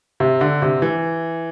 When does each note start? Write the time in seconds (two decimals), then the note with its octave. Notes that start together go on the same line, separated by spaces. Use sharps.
0.20 C3
0.41 D3
0.62 C3
0.82 E3